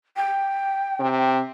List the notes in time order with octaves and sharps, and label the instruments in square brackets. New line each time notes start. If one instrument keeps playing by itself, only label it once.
[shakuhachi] G5
[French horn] C3